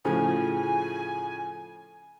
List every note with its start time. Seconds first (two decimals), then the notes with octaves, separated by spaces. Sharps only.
0.05 A2 C#3 F3 G#5